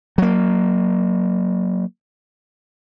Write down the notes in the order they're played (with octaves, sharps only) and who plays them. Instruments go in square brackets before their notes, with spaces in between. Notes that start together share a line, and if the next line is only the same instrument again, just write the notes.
[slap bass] F#3 A#3